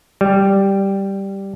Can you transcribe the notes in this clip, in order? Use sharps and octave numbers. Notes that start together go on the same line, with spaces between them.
G3